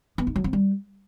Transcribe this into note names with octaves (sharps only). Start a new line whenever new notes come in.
B3
D#4
F#3
C4
G3